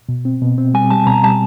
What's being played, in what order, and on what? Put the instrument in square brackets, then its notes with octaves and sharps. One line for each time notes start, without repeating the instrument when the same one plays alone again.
[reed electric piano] B2
C4
B2
C4
[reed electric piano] G3 [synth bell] G#5
[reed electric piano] G3 [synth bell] A5
[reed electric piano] B2 [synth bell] A#5
[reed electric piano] G3 [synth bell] A5